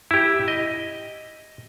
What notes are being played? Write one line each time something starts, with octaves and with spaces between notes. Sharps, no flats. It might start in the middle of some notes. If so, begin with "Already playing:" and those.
E4 G4
D#5